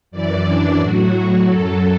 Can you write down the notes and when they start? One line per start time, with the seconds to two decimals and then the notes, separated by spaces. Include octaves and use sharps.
0.11 F#2 E3 D5
0.46 D4
0.78 A2 F#3 F#4
1.46 F#2 F#3 A4